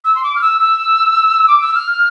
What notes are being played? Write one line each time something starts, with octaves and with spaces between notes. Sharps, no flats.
E6
C6
D6
F6
E6
E6
D6
E6
F6